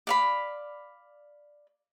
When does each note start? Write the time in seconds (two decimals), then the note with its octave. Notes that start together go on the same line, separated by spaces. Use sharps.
0.07 D5 F5 B5